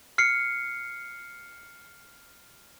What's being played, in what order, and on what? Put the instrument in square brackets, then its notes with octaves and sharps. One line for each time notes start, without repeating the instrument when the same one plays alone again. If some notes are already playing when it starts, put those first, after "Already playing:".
[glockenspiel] F6 C7 C#7